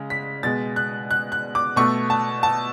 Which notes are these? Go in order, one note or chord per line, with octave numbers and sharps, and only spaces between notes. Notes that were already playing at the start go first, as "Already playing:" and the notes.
Already playing: C#3 G#3
B6
B2 G#3 A6
F#6
F#6
F#6
D6
B2 A3 C#6
A5
A5